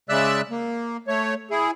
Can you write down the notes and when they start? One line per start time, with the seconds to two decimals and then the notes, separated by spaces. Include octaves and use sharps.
0.09 C#3 G#3 D5 E5 E6 F#6
0.50 A#3
1.08 A3 C#5
1.51 E4 G#4